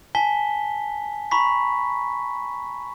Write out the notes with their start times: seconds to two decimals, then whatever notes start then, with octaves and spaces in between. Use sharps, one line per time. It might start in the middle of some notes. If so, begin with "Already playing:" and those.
0.15 G#5 A5 B6 G7
1.31 A#5 B5 C#6 B6